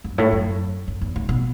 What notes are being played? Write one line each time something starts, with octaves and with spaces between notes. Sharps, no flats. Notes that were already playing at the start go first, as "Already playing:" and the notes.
F#2
A2
F#2
F#2
E2
A2
B2